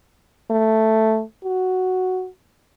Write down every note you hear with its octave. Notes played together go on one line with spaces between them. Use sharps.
A3
F#4